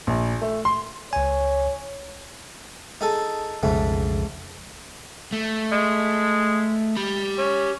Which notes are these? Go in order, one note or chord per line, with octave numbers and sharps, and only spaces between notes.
A#1
A3
C6
C#2 C#5 G#5
D#4 G#4 A4
B1 F2 G#2 C#3 A3
A3
G#3
G4 B5
C#4